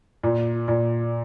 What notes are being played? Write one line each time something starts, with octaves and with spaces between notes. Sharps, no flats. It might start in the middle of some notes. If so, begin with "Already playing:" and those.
A#2
A#2